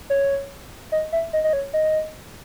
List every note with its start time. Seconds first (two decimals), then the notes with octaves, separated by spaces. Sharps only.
0.10 C#5
0.92 D#5
1.12 E5
1.33 D#5
1.44 D#5
1.53 C#5
1.73 D#5